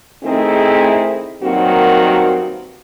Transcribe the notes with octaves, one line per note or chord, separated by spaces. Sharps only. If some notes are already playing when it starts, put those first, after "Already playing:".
D#3 A3 C4 E4 G#4
G2 D#3 F#3 A#3 C4 F#4